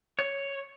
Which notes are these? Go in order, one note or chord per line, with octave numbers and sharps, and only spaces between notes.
C#5